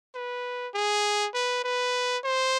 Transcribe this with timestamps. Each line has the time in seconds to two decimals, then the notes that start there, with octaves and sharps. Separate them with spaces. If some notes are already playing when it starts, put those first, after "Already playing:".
0.15 B4
0.74 G#4
1.34 B4
1.64 B4
2.24 C5